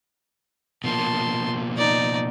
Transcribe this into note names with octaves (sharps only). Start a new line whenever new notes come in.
B2 F3 A#3 A5 C6
D#4 D5